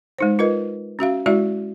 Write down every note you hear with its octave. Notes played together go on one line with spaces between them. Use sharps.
G#3 D#4 C5
F4 A#4 B4 D#5
C#4 F#4 E5 F5
G#3 E4 F#4 D5 E5